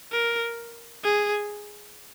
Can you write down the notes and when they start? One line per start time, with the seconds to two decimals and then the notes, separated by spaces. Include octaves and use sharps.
0.12 A#4
1.04 G#4